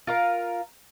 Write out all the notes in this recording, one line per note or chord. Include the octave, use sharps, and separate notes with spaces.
F4 A#4 F5